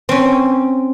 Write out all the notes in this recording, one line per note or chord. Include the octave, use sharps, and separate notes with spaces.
C4 C#4